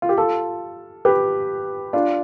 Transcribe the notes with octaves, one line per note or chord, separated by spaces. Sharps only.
F4
G4
F4 A4
G4 B4
D4 F4